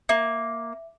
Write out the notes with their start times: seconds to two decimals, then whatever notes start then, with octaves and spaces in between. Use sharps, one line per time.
0.09 A#3 E5